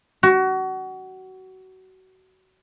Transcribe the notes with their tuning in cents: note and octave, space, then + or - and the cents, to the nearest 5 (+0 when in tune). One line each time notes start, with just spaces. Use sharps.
F#4 +25